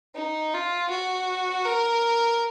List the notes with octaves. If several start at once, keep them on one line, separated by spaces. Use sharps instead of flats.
D#4
F4
F#4
A#4